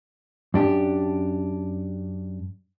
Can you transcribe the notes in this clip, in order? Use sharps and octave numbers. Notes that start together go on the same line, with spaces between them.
F#2 D4 G4